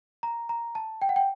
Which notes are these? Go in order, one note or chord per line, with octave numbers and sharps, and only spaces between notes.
A#5
A#5
A5
G5
F#5
G5